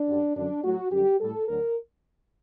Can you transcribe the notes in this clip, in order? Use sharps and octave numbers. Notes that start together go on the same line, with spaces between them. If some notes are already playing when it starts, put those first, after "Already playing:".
Already playing: D4
F#2 D3 G3
F#2 D3 F#3 D4
A2 F#3 F#4
F#2 D3 G3 G4
A2 G3 A4
D2 D3 F#3 A#4